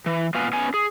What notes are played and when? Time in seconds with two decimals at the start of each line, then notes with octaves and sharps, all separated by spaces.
0.06 E3
0.35 A#2 B3 B4 F5 G#5
0.53 B3 C#4 G#5
0.74 G#4